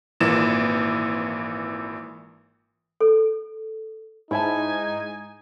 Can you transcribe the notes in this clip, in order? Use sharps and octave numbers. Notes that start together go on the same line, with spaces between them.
G#1 A#2 E3 E7
A4
G#2 D#4 E4 E5 G#5 A5